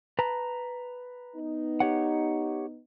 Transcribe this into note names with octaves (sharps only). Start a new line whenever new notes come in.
B4 A5 A#5
B3 D#4
G4 C#5 F#5